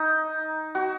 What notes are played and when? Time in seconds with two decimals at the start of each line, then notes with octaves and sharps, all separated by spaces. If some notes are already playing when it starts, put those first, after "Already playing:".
Already playing: D#4
0.75 F#4